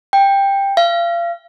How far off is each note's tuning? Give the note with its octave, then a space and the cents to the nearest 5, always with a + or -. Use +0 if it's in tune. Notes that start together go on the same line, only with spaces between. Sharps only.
G5 +10
F5 -35